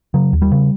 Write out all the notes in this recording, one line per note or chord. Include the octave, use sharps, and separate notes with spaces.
C#3 F#3
D#2
G3
C#3